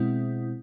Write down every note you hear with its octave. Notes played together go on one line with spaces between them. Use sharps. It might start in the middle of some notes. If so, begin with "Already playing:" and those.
Already playing: B2 G#3 C4 E4